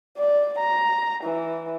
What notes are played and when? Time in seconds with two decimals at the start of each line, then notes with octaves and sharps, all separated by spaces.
0.17 D5
0.59 A#5
1.24 E3